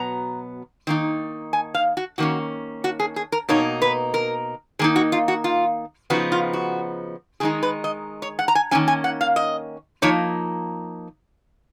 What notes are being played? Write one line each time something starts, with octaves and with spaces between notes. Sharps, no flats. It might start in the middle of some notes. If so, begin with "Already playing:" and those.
Already playing: B2 F#3 B3 A#5
D#3 A#3 D#4
G#5
F5
F#4
D#3 A#3 C#4 F#4
F#4
G#4
G#4
A#4
B2 A#3 D#4 C#5
B4
A#4
D#3 A#3 D#4 G#4
F#4
F4
F#4
F4
C#3 F3 B3 D#4 F#4
F4
F#4
D#3 G#3 D#4 G#4
B4
D#5
C#5
F#5
A#5
G#5
D#3 A#3 C#4 G#5
G#5
F#5
F5
D#5
F3 A#3 D#4 C#5